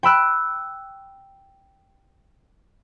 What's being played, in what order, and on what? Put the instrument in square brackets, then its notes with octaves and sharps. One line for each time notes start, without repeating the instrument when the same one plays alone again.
[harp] G5 B5 E6 F#6